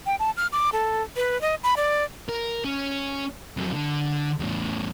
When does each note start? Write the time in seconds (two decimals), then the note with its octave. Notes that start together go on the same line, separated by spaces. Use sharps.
0.06 G5
0.19 A5
0.37 F6
0.53 D6
0.73 A4
1.16 B4
1.41 D#5
1.63 B5
1.77 D5
2.29 A#4
2.64 C#4
3.57 F2 F#3
3.74 D3
4.40 E2 A2